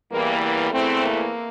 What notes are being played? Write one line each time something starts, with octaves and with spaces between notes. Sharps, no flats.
E2 E3 G3 A#3
A#3
E2 E3 A3 C4
A#3